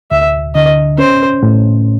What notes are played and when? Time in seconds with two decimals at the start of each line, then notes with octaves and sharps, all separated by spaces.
0.11 D2 E5
0.55 D3 D#5
0.98 C#4 C5
1.43 A2